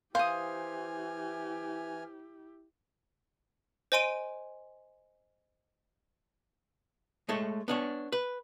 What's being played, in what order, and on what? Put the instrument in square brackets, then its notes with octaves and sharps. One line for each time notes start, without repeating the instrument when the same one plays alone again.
[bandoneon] E3 G#5 F6 [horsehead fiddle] E4 G4 [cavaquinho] C5 D#6 [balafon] F5
[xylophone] C5 D#5 G#5 C6 D7 D#7
[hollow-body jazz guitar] G#3 A3 A4 C#5
B3 D4 C#5
B4